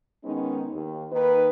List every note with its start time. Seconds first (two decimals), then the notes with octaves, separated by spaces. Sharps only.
0.24 D#3 G#3 B3 C#4 D#4
0.72 D#2
1.12 D#3 A#3 D#4 B4